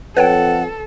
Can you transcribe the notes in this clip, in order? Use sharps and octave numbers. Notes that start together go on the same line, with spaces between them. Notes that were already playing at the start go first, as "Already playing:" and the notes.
F2 A4 B4 C#5 F#5 G5